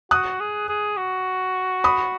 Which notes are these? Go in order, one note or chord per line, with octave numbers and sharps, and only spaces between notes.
F#4 D#6 F#6
G#4
G#4
F#4
B5 D#6